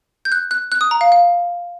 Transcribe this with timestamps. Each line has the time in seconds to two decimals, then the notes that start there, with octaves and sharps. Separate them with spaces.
0.25 G6
0.32 F#6
0.51 F#6
0.72 F#6
0.81 D#6
0.91 A#5
1.01 F5
1.12 F5